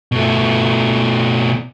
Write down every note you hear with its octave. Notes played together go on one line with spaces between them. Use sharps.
B2 A3